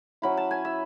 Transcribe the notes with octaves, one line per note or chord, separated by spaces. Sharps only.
F#3 C#4 E4 B5
A5
G#5
E5